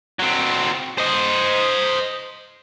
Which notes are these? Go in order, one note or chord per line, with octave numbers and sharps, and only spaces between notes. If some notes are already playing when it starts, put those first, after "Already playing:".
F#3 C4
C5 D#5